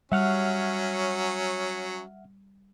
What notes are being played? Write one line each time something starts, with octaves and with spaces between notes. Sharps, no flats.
F#3 G3 C#4 E5 F#5 F6